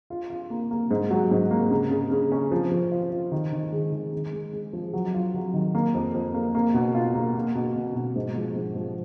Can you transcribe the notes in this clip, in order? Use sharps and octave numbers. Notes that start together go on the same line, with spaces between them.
F4
F4
A#3
A#3
G#2
F#3
G#2
A#3
C#3
C#3
C#3
C#4
F3
F3
F4
F4
D#3
D#3
G#3
D#3
G#3
G#3
G#3
F3
F#3
F4
F#3
D#3
A#3
F2
F2
A#3
A#3
B2
F4
A#3
A#3
B2
B2
B2
G#2
F3
G#2
F3